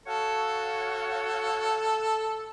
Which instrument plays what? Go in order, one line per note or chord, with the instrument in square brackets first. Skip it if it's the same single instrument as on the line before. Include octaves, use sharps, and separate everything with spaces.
[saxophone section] F#4 C#5 F5 [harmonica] A4